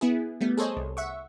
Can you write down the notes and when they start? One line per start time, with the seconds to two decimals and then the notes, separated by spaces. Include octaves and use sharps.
0.01 B3 E4 G#4
0.41 G3 A3 B3
0.58 G#4 A4 C5 C#5 D#5
0.77 C2
0.97 E5 F#5 C#6